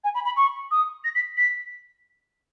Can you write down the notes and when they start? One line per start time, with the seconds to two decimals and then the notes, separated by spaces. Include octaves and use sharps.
0.04 G#5
0.14 B5
0.25 B5
0.36 C#6
0.71 D#6
1.04 A#6
1.15 B6
1.37 B6